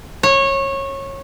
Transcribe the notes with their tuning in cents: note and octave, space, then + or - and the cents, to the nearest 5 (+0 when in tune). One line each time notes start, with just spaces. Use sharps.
C#5 -20